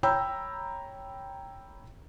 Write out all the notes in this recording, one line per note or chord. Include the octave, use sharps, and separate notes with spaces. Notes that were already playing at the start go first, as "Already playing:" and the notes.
C#5 G5 A#5 B5 E6 G6